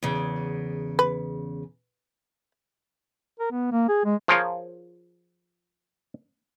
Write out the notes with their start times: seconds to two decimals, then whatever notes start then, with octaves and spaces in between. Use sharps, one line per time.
0.03 E2 C#3
0.99 B4
3.39 A#4
3.51 B3
3.72 A#3
3.88 G#4
4.05 G#3
4.28 F3 F4 G#4 A#4 C#5 F5